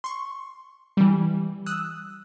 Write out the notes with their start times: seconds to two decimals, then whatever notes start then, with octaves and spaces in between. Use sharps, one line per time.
0.04 C6 C#6
0.97 E3 G3
1.66 D#6 E6 F#6